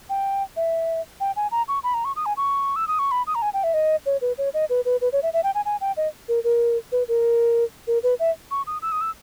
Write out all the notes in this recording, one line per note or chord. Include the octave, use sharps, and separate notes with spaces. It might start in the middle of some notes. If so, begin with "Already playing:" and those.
G5
E5
G5
G#5
A#5
C#6
B5
A#5
C#6
D#6
G#5
C#6
E6
D#6
C#6
B5
D#6
A#5
G#5
G5
E5
D#5
C#5
B4
C#5
D#5
B4
B4
B4
C#5
E5
E5
G5
G#5
G#5
G5
D#5
A#4
A#4
B4
A#4
A#4
B4
E5
C#6
D#6
E6
D#6
E6